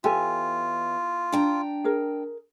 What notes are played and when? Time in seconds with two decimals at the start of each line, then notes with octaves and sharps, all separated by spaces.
0.04 E2 F4 G4 A4 G#5
1.32 D4 G5 A#5
1.84 G#4 A#4